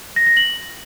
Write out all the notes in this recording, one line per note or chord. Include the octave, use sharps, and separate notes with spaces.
A#6
A#6
F#7